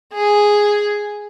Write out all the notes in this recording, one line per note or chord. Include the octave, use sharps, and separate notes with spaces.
G#4